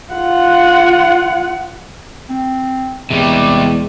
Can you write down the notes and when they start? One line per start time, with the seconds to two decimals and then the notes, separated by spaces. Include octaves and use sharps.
0.13 F4 F#5
2.29 C4
3.11 E2 C3 G3 G#3